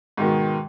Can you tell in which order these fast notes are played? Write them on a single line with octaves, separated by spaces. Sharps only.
G#2 D#3 B2